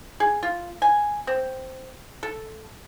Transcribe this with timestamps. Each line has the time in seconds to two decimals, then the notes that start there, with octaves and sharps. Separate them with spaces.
0.20 G#4
0.43 F4
0.82 G#5
1.27 C4
2.23 A4